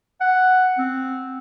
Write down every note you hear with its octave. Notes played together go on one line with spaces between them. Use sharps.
F#5
C4